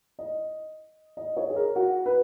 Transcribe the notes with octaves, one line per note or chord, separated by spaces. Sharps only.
D#5
D#5
C#5
G#4
A#4
F#4
B4